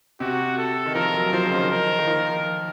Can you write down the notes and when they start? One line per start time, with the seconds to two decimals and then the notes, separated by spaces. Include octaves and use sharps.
0.20 C3 F#4
0.58 A4
0.86 D#3
0.95 F3 A#4
1.14 F#3
1.33 F3 C5
1.46 C#3
1.51 D#3
1.70 D#3 A#4
1.99 D#3
2.07 F3